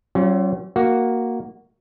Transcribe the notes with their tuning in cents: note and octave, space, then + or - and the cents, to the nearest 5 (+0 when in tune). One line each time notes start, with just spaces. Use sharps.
F#3 +45 C#4 -25 F4 +0
A#3 +0 F#4 +0